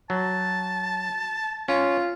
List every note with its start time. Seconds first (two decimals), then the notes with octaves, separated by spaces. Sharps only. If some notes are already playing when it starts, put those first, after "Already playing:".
0.10 F#3 A5
1.68 C#4 F4